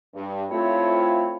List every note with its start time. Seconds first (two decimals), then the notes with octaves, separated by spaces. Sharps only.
0.14 G2
0.51 A3 C4 E4 F4 C#5